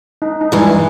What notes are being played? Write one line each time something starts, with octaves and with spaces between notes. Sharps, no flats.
D#4
D#4
G2 E3 G#3 E4